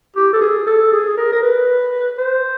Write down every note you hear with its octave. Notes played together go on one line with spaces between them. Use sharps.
G4
A4
G#4
A4
G#4
A#4
A#4
B4
C5